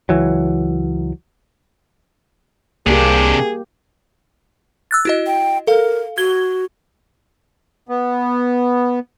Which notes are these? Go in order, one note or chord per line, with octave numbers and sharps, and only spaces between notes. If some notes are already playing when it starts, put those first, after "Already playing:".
C#2 E3 F#3
C2 C3 A#3 D4 G4 G#4
E6 F#6 A6
E4 F#4 D#5
G5
A4 A#4 F5
F#4 G#6 G7
B3